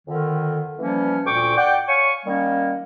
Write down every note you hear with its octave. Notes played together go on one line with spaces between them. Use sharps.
F2 D3 D#3
E3 F3 G3 A#3 C#4
D2 A#2 G5 C#6 D6
D5 F#5 G5
C#5 F5 G#5 C#6
D#3 G3 A#3 C#4